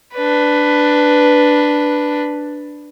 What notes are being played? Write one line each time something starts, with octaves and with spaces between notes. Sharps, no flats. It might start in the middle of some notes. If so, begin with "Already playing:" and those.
D4 B4